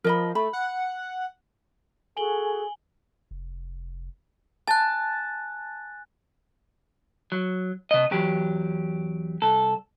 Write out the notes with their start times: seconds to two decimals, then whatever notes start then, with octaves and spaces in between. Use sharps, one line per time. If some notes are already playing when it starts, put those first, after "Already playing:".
0.04 F3 A#4 D#5 B5
0.35 A3 B5
0.53 F#5
2.17 F#4 G#4 A4 G#5 F#7 G7
3.31 F1
4.68 G#5 A5 F#6
7.32 F#3
7.91 C3 D#5
8.11 E2 F#3 G4
9.42 C2 A4